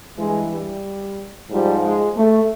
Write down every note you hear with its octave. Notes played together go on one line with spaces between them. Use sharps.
G2 E3 G#3
G3
G#2 F3 G3
G#3
A3